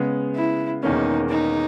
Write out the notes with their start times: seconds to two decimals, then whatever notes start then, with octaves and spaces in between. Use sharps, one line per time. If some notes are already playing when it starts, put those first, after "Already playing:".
Already playing: C#3 G#3 B3
0.36 E4
0.83 E1 E2 D#3 A#3 C#4 D#4
1.30 D#4